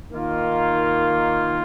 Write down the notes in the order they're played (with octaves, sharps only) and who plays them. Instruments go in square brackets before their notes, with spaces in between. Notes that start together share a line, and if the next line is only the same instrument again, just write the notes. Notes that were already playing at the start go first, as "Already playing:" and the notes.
[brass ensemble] D#3 A#3 F4